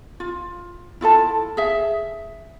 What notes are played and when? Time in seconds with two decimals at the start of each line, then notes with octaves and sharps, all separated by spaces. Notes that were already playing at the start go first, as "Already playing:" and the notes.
0.20 F4
1.01 E4 F4 A4 A5
1.57 G#4 E5